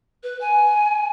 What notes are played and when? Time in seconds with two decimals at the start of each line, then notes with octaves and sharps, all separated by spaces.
0.23 B4
0.41 G#5